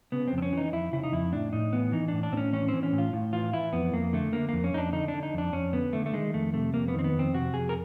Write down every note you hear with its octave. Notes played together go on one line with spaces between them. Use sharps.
C#3 B3
C4
F2
C4
C#4
E3 D#4
F2 E4
C#3 E4
D#4
F2 E4
A2 D4
A2 D#4
E3 B3
E3 D#4
A2 D4
D4
A2 C4
C#4
E3 C#4
C4
E3
C#4
A2
F4
A2
E3 F4
E3 E4
F2 B3
F2 A#3
D3 A3
D3 A#3
F2 A#3
C#4
F2 D4 D#4
D3 D#4
D4
D3
D#4
F2 D4
F2 C#4
D3 B3
D3 A3
A3
D#3 G#3
F2 A3
C3 A3
F2 A#3
B3
D#3 C4
B3
F2
C4
C3 F#4
F2 G#4
A#4